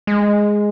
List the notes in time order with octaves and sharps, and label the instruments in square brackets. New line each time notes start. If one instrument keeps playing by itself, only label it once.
[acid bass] G#3